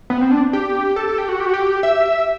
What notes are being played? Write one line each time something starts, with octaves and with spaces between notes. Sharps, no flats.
B3
C4
D4
G4
A4
A4
G4
F#4
G4
F#4
G4
E5